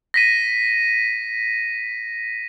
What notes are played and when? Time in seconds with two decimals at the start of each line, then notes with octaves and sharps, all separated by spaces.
0.14 A#6 B6 D#7